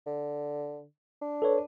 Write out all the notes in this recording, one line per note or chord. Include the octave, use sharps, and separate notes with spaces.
D3
D4
A4 B4 C#5